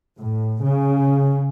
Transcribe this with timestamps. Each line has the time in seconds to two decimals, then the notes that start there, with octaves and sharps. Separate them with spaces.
0.17 A2
0.63 C#3